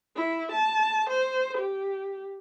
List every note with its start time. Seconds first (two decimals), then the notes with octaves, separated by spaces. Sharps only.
0.16 E4
0.52 A5
1.10 C5
1.58 G4